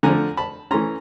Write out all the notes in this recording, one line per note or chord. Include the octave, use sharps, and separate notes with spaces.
D3 F3 A3 G#5 A#5
A5 B5
E3 A3 C#4 A#5 C6